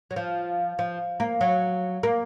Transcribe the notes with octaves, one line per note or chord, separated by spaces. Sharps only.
F#3
F3
F3
A#3
F#3
A#3